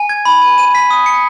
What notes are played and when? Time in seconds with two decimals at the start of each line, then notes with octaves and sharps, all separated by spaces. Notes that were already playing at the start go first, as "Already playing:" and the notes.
Already playing: G#5
0.09 G#6
0.25 B5
0.42 G#5
0.58 D#7
0.75 B6
0.90 D#6
1.06 C#7